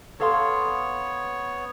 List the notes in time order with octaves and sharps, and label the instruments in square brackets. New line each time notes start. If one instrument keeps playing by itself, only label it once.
[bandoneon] B3 C#5 [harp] A4 F5 C6